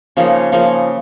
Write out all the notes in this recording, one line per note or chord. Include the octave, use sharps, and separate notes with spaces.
C#3 F3 A#3 D#4
C#3 F3 A#3 D#4